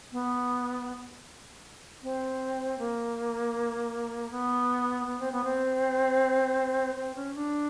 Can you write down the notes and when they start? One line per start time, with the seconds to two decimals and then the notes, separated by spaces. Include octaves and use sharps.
0.12 B3
2.03 C4
2.78 A#3
4.31 B3
5.07 B3
5.20 C4
5.32 B3
5.44 C4
6.96 C4
7.15 C#4
7.35 D4